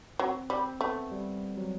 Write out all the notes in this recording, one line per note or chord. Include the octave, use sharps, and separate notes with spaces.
F#3 C4
G3 C4
A3 B3
G3
F#3